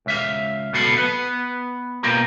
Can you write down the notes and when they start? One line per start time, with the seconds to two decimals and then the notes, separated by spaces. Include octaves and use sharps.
0.06 C#2 E5 F5
0.73 D2 B2 F#3 A4 F5 B5
0.96 B3 B4
2.03 B2 A#3 F4 G4 A#4